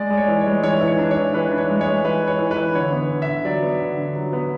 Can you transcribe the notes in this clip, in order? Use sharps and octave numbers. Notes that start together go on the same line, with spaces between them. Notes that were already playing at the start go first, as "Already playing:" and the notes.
Already playing: G#3 D5
G#3 D5
C#5
E3
C#5
G#3
E3 C#5
E3
C#5
D4
C#5
E3
E3 B4
D4
C#5
G#3
C#5
G#3
E3 B4
E3
C#5
E3
B4
E3
D3 C#5
B3
D3
E5
D3
F#3 D5
B3
D3
D3
F#3
B3